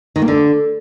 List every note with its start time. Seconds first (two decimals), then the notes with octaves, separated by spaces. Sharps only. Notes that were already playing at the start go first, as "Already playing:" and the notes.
0.16 D#3
0.22 A#3
0.28 D3